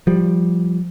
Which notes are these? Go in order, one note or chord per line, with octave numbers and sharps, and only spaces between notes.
F3 G3